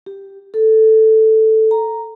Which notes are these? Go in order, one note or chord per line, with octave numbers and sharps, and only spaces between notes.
G4
A4
A#5